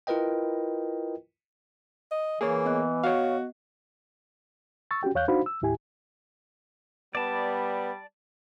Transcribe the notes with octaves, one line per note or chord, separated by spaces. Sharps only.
E4 F4 A#4 B4 D#5 G5
D#5
E3 A#3 G#4 C#5
B3 D#5 F#6
F#4 C#5 F5
C#6 E6 A6
C#4 F#4 G4 G5
E2 C#5 F5 F#6 G6
D4 D#4 F#4 C5 F5 B5
E6
D#2 A2 E4 G4 G#5
G3 B3 D5 A5